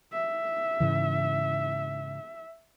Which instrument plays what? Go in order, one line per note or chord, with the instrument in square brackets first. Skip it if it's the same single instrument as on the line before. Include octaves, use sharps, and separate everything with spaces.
[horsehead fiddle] E5
[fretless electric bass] G#2 C#3 E3